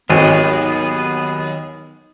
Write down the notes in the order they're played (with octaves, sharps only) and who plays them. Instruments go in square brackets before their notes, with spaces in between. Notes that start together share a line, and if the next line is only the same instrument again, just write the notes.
[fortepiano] G#1 [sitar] D#2 [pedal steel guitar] F#3 G#4 [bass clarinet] B3